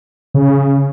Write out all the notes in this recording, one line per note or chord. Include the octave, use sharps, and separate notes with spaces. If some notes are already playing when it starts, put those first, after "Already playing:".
C#3